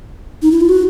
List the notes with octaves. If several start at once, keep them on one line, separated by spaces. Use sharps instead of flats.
D#4
E4
F4
F#4